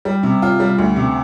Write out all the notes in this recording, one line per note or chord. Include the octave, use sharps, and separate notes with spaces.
G3
C3
F4
G3
D2
C3